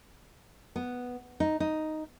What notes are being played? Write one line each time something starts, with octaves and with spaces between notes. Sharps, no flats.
B3
D#4
D#4